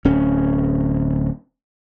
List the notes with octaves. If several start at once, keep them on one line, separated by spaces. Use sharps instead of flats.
D1 C#4